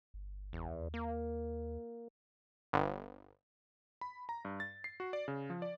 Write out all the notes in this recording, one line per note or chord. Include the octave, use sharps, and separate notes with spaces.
G1
E2
D#2
A#3
G1
B5
A#5
G2
A6
C7
F#4
D5
C#3
F3
D5